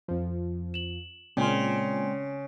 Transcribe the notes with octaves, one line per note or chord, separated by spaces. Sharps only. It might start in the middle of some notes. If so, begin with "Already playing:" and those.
F2 F3
E7 F#7
A#2 C#3 G#3 C4 D5 G5 G#5 C6